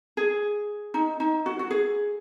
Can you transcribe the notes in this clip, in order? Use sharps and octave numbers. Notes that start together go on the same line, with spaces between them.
G#4
D#4
D#4
F#4
F#4
G#4